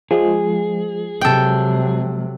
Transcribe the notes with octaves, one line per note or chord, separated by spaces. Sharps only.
F3 G#3 G#4
C3 F#3 A4 G5